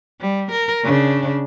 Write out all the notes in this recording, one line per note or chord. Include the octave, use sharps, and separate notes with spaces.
G3
A#4
C#3 D4